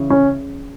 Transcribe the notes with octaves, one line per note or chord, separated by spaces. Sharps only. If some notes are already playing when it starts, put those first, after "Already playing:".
Already playing: C#3 E3
C#4